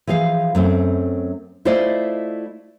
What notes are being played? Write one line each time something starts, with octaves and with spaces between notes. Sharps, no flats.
E3 F3 G#4 F5
F#2 A3 C4
A3 E4 F4 C5 D5 D#5